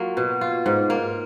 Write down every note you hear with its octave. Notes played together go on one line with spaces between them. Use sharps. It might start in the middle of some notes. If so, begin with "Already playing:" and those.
Already playing: F#3 A#3 F4
B2
F4
G#2
A#3